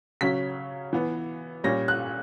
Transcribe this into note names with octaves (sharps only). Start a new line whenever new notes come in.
C#3 F#3 C#4 B6
E3 B3
A#2 G3 C#4 A#6
F#6